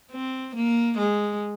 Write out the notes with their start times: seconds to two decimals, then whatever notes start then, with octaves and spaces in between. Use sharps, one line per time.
0.12 C4
0.56 A#3
0.98 G#3